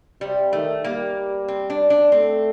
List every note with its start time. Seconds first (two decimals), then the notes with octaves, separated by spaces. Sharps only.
0.21 C3 G3
0.53 D#3 A3
0.84 G3 A#3
1.48 C4
1.70 D4
1.90 D4
2.12 A3 C4